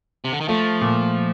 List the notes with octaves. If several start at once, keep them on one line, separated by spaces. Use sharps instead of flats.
C3
D3
D#3
F3 A3
A#2